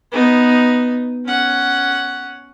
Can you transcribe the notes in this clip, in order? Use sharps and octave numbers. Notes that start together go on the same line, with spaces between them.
B3 D#4
C#4 F#5